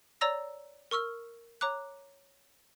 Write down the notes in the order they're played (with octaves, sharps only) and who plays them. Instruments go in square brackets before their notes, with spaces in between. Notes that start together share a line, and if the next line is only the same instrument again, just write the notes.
[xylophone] C#5 D5 A#5 E6 A#6
A#4 C#6 E6 F6
C#5 A#5 D6 F#6